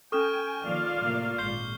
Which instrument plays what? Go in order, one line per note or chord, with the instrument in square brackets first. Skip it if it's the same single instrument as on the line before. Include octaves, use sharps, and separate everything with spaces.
[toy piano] C#4 A4 [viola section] G5 G#5 [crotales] C#6 F6 E7
[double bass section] D#3 F3 A#3 [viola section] F4 D5 F5
[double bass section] A2 C3 A#3
[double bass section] G#1 A#2 [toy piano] C6 [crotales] G6 C7 G7